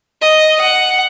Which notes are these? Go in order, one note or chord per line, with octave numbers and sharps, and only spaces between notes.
D#5
F#5